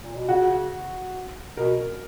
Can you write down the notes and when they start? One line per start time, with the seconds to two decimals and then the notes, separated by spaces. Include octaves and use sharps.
0.03 A#2
0.15 B2
0.29 C#3 F#4
1.57 B2 A#4